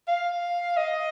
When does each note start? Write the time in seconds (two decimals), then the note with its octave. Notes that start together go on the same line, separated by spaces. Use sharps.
0.08 F5
0.77 D#5